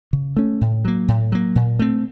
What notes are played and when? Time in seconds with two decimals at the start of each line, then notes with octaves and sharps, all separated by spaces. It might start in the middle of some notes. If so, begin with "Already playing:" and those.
0.13 C#3
0.37 A3 C#4
0.61 A2
0.85 F#3 A#3
1.08 A2
1.32 F#3 A#3
1.55 A#2
1.79 A3 C4